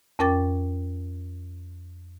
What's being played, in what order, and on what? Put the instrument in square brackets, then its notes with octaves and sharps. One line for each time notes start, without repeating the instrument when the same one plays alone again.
[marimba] F2 C#4 A#4 G5 D6 A6